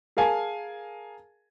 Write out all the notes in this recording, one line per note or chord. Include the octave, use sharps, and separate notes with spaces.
G#4 A#4 F5 G#5 A5